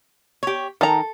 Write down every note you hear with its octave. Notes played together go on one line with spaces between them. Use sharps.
G4 C#5
D#3 A4 A#5